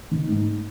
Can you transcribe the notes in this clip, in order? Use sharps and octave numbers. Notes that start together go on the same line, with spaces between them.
D#3
G#2